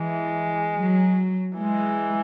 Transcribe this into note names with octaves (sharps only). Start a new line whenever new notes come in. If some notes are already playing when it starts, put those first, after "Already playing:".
Already playing: E3 G#3
F#3
E3 G#3